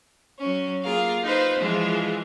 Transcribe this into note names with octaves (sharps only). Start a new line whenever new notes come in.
F#3 C#4
A#3 F4 G#4 A#4 F5
D#4 F4 B4 C5
E3 F3 G#3 F4